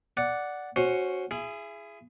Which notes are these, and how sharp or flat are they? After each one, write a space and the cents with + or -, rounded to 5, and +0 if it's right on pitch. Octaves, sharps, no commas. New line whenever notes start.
D5 -5 F#5 +0
C#4 +0 F#4 +0 C5 +15
E4 +35 G#4 +0